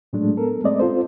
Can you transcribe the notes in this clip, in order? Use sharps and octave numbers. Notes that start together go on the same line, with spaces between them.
A2 F#3 G#3 A3 D4
B3 A4 A#4
G#3 A3 C4 D5 D#5
C4 F4 A4 C5